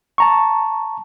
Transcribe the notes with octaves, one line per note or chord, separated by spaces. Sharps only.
A5 A#5 C#6